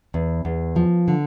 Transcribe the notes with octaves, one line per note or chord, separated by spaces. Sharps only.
E2
E2
F3
D3